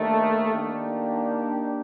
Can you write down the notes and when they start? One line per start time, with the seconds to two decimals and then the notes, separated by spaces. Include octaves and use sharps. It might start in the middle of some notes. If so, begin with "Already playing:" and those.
Already playing: D#2 D#3 A3 D4
0.54 D#3 A#3 D4 G4